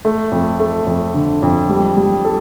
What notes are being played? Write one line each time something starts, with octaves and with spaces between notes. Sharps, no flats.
A3
F2
A3
F2
D3
F2
G3
G3
A4